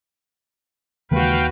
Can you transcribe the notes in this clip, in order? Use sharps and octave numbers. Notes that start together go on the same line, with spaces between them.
D#2 C#3 E3 G#3 F#4 B4 F5 G5